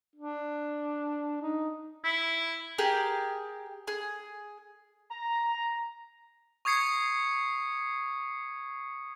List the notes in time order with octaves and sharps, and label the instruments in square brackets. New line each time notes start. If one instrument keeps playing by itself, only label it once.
[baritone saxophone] D4
D#4
[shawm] E4
[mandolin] G4 G#4 A#4
G#4
[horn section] A#5
[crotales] C#6 D#6 G#6 C7 C#7